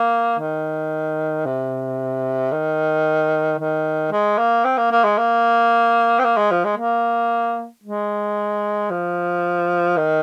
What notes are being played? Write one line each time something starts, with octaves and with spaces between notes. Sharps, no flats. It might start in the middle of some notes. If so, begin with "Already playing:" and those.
Already playing: A#3
D#3
C3
D#3
D#3
G#3
A#3
C4
A#3
A#3
G#3
A#3
C4
A#3
G#3
F3
G#3
A#3
G#3
F3
D#3